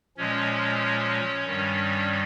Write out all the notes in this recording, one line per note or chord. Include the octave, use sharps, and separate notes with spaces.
A#2 F3 G#3 C#4 C#5
G2 D#3 G3